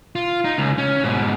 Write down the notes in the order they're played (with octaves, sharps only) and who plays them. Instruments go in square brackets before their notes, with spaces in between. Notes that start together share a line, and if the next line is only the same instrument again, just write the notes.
[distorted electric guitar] F4
D#4
C#2
C#4
G#2 B2